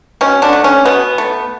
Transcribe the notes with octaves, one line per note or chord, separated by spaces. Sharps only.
B2 C#4
D3 D4
A3
C#4
B2 B3
A3